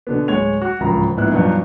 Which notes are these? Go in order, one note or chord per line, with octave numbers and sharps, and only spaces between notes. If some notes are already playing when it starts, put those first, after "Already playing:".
B2 D3 B3
D1 G#3 C#5 G#6 F7
F#4
D1 G#1 C#2 F3 A#5 B5
A#1 G#2 B3 E4 F#6
G2 B2 F3 F#3 B3 D#4